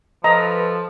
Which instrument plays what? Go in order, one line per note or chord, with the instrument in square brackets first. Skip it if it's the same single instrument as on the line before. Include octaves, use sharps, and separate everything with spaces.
[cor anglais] F3 [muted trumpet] A4 [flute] B4 [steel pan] D#5 A#5